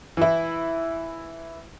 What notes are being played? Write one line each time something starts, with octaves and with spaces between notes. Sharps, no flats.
E3 E4